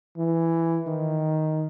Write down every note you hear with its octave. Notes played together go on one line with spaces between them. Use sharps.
E3
D#3